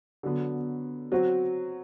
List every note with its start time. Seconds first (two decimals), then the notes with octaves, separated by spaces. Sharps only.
0.23 D3 F#3 B3
1.12 F#3 C4 F#4